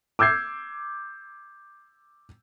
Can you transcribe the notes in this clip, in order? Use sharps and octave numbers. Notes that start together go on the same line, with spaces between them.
D6 E6 G6 G#6 C7